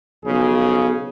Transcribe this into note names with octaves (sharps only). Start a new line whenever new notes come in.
B1 C#3 F3 G#4